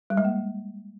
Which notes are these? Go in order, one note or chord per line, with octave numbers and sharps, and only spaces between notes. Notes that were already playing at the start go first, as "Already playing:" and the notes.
G3
G#3
A#3